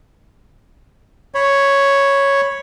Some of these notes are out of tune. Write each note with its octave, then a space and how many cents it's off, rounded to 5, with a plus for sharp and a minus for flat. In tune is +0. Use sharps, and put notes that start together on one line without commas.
C#5 +0 B5 +0